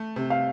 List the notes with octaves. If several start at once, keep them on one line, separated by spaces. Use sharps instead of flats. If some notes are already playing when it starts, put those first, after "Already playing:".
Already playing: A3
C3
F5